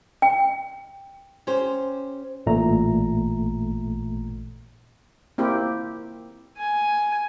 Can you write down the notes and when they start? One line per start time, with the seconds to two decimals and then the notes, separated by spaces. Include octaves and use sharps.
0.22 G5
1.47 C#4 G4 C5
2.46 A1 A#2 A3 A#5
5.38 A#3 C4 E4 G4
6.57 G#5